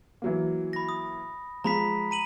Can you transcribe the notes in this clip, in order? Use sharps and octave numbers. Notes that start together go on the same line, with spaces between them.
E3 F#3 A#3
B5 A#6
D#6
F3 G#3 A#5 B5 B6
A#5 D#7 F#7